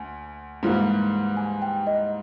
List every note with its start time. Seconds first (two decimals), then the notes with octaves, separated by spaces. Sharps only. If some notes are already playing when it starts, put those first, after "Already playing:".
Already playing: D2 G#5
0.63 G#2 E3 G3 A#3
1.37 G#5
1.62 G5
1.87 D#5